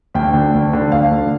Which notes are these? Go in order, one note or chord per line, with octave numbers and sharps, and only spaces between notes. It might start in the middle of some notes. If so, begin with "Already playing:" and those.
D2 G5
D3
D2
D3
D2 F5
D3